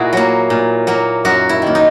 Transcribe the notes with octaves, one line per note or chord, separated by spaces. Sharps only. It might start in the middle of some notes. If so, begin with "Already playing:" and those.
Already playing: A#2 E4 F#4 G#4 A#4
F#3 A#3
A#2
F#3 A#3
F#2 F#4
E4
D#3 A#3
D#4